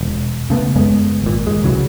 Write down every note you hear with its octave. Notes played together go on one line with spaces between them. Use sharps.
E1
C#3 A3 B3
F#1 F#2 G#3 B3
G#1 A#2
D#2 G#3
C2 C#3 E3 F#3